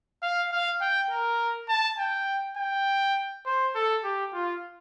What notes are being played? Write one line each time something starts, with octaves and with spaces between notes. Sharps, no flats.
F5
F5
G5
A#4
A5
G5
G5
C5
A4
G4
F4